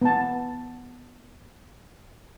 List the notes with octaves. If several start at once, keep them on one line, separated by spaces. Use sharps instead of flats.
B3 A5